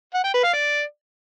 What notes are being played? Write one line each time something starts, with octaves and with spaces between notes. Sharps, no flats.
F#5
G5
B4
F5
D5